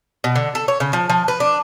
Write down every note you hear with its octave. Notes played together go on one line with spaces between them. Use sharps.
B2
D3
A4
C#5
C#3
F3
F3
B4
D4